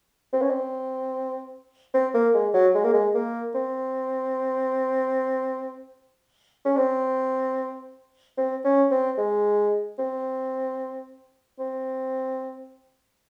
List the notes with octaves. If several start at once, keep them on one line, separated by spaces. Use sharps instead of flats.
C4
C#4
C4
C4
A#3
G#3
F#3
G#3
A#3
G#3
A#3
C4
C#4
C4
C4
C#4
C4
G#3
C4
C4